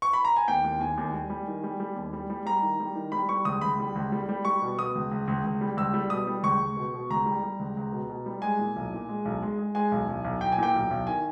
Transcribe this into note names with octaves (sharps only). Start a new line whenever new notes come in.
C#6
B5
A#5
G#5
D#2 G5
D#2
D#2 G#5
D#2
G3
G3
D#3
G3
G3
D#2
G3
G3
G3 A#5
D#3
G3
D#3
G3 B5
G3 C#6
C#2 D#6
C#2 B5
G3
C#2
G3
G3
G3 C#6
B2
B2 D#6
C#2
C#2
C#2
C#2
G3
C#2 E6
G3
B2 D#6
G3
C#2 C#6
C#2
B2
B2
C#2 A#5
G3
G3
C#2
C#2
B2
B2
G3
G#3 G#5
A#2
B1
A#2
G#3
B1
G#3
G#3
G#3 G#5
B1
B1
B1
B1 G5
G#5
A#2 G5
B1
B1
D#3 G#5